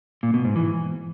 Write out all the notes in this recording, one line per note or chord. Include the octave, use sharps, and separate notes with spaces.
A#2
B2
G#2
E3